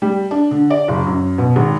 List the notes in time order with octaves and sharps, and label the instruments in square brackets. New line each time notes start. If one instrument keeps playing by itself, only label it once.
[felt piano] G3
D4
D3
D5
F#1
F#2
B2
G#1